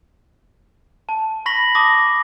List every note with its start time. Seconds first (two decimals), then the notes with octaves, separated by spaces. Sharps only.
1.09 A5
1.46 B5 C#6 A#6 B6 F#7
1.75 A5 D6 D#6 A#6